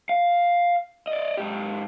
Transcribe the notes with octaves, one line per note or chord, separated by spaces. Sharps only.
F5
D5 D#5
G#2 G4